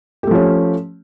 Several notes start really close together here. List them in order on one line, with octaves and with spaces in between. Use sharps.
G4 A3 F3 C#4